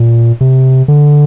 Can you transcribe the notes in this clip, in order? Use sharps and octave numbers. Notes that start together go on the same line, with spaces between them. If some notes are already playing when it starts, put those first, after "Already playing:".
Already playing: A#2
C3
D3